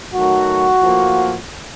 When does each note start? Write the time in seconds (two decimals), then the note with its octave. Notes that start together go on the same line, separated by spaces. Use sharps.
0.13 D#3 F#3 A3 F#4
0.81 A2 F3 A#3